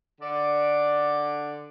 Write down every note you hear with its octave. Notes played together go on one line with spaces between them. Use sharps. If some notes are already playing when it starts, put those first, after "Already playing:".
D3 D5